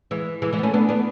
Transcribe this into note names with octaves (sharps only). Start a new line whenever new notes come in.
E3 G#3
E3 G#3
E3 G#3
B3
A3 C#4
B3 D4
B3 D4